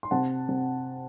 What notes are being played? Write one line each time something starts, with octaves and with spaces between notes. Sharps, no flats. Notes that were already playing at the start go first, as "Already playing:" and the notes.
C6
C3 F#5 A5
C3